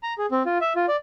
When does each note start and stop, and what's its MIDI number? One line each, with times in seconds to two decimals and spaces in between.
0.03 0.14 82
0.18 0.26 68
0.31 0.43 60
0.46 0.58 65
0.61 0.73 76
0.75 0.86 65
0.88 0.96 74